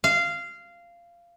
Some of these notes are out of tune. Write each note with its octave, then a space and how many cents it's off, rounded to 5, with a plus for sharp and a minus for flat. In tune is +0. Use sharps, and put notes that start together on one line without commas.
F5 -15